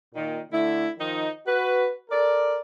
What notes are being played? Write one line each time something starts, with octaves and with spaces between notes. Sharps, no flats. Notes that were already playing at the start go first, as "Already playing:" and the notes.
A#2 D#3
D3 A3 E4
D#3 F3 D#4
F#4 B4
A4 A#4 D5